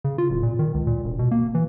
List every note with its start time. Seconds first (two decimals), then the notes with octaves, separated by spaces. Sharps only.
0.05 C#3
0.18 F4
0.30 D1
0.43 A#2
0.59 D#3
0.74 C#2
0.87 A#2
1.04 E1
1.19 B2
1.31 A#3
1.55 E3